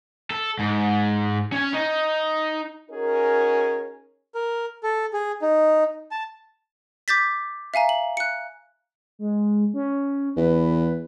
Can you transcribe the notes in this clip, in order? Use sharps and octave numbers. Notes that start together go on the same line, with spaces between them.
A4
G#2
C#4 G#5
D#4
C#4 D#4 F#4 G#4 A#4
A#4
A4
G#4
D#4
A5
D6 G6 A6 B6
E5 F5 G#5 A#5
F#7
F#6 C#7
G#3
C#4
E2 B4